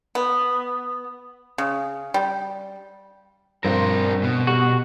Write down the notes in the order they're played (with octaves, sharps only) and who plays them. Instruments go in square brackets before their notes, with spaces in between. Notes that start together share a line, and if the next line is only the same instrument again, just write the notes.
[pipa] B3
C#3
G3
[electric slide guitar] G2 [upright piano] F3 C4 [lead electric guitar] D4 A#4
[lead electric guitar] B2
[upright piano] G3 [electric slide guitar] F#4